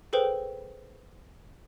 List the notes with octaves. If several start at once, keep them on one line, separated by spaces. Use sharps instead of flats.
G#4 A4 B4 C5 G5